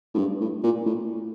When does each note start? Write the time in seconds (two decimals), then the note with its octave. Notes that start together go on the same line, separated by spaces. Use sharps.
0.14 A2
0.18 G2
0.41 A2
0.63 A#2
0.86 A2